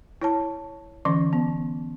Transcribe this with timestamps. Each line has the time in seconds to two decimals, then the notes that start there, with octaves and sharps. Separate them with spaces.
0.22 E4 C#5 A5
1.05 D3 E3 C#4 C6
1.33 B3